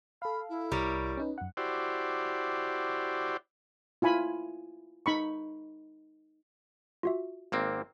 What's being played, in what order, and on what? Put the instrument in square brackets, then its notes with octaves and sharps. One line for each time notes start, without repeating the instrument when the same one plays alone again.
[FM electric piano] A4 F5 [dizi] B5
[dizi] E4
[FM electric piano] C2 [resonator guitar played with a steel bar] G3 A#4 C#5
[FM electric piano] C#4 D#4 B4
F#2 F#5
[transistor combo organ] E4 F#4 G4 C5 D5
[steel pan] E4 F4 G#5 B5
D#4 B5 C#6
[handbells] F4 F#4 E5
[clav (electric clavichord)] G#1 A#3 C4